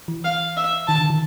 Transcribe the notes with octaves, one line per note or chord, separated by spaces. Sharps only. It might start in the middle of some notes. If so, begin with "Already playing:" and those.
E3
F5
E5
D#3 A5
D3
D#3